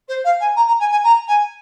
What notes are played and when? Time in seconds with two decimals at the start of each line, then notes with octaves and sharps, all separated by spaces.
0.08 C5
0.24 F5
0.40 G#5
0.56 A#5
0.67 A#5
0.79 G#5
0.91 G#5
1.04 A#5
1.27 G#5